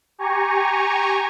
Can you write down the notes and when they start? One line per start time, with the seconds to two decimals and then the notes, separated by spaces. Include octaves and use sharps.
0.18 G4 G#5 A#5 C#6